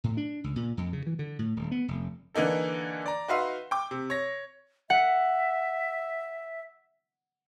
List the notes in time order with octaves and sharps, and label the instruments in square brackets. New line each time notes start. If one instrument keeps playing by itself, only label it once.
[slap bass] A2
D4
C#2
A#2
F2
C#3
E3
D3
A2
D#1
B3
F1
[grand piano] D3 E3 A#3 D#4 A4
D5 A#5
D#4 F#4 B4 E5 F5 C6
G5 D6
C3
C#5 A#6
[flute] E5 [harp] F#5